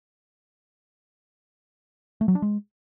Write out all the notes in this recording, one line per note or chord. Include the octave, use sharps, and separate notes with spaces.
A3
F#3
D4
G#3